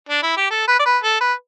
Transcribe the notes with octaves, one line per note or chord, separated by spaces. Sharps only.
D4
E4
G4
A4
B4
D5
B4
A4
B4